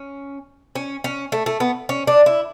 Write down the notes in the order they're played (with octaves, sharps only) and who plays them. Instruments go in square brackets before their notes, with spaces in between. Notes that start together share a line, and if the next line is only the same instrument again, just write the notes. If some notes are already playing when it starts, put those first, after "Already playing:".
Already playing: [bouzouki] C#4
C#4
C#4
A3
A3
B3
C#4
D4
E4